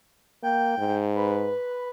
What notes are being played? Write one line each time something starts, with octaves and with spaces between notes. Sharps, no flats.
A#3 G5
G#2
B4